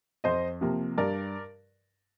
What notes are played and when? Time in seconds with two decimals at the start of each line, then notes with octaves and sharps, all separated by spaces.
0.24 F2 C5 D#5
0.61 C3 F3 A#3
0.98 G2 A#4 D5